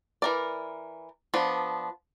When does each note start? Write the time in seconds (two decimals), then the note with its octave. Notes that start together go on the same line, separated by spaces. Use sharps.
0.22 E3 A#4 D5
1.34 F3 B3 D4